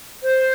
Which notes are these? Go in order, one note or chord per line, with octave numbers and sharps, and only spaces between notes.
C5